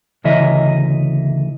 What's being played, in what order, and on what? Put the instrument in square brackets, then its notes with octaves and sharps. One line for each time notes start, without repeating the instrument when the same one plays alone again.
[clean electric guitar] D2 C#3 E3 D#5 E5